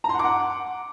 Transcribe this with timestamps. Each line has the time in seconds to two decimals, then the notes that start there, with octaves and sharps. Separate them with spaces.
0.04 A#5
0.09 C6
0.14 F#5
0.19 D6
0.24 F#5